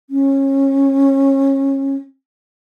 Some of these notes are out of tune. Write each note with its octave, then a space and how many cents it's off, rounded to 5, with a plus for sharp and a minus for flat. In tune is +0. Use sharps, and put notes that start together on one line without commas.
C#4 -25